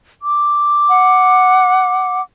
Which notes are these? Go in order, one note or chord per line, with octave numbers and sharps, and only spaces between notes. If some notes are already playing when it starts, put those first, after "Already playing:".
D6
F#5